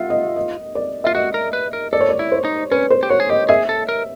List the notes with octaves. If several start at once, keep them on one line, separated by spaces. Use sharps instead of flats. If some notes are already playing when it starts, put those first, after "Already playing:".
Already playing: F4 E5 F#5
D#5
D#5
D5
F4 E5
F#4 D#5
A#4
B4
A#4
A4 D5
C#5
D5
E4
C5
D#4
C#4 B4
C5
G4
F#4 C#5
G#4
G4 D#5
G#4 E5
A4
A#4